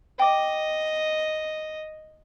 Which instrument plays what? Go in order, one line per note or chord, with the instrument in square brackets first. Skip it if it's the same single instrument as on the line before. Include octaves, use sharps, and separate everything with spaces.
[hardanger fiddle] D#5 [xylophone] G5 D6